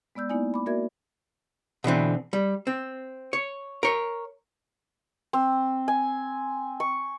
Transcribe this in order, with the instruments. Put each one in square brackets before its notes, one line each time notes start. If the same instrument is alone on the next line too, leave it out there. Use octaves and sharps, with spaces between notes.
[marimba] G#3 B3 D5 E6 G6
A#3 B3 D#4 E4 D5 G#5
B5 D6
A#3 F#4 A#4 D5 E5 G#6
[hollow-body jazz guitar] B2 D3 E3 C4
G3
C4
C#5
A#4 C#5
[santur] C4
G#5
C#6